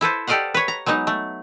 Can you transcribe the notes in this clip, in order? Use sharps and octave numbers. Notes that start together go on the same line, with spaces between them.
E4 A4 B4 C5
G4 A4 D5 D#5 F5 F#5
B4 C#5
A#5
F#3 G#3 B3 D#4
A3